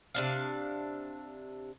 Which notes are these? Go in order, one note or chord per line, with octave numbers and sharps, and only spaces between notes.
C3 D4 F5